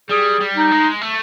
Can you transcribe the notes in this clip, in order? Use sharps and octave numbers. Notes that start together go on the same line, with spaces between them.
G3 G#4
G3
D#4
G#3
A3